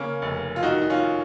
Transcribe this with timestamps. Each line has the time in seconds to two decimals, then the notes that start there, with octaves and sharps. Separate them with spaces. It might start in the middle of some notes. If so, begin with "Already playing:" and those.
Already playing: C#3 A#3 C#4
0.22 F1
0.56 F4
0.63 D#3 D#4 F#4
0.81 D#4
0.90 C#4 F4